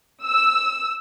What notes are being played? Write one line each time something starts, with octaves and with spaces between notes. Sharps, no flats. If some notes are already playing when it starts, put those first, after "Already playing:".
E6